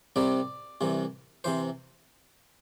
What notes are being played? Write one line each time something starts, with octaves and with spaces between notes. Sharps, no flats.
C2 C3 G3 C4 D5
C2 C3 E3
C3 E3 C5